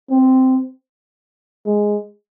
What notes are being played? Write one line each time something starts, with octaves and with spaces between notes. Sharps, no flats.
C4
G#3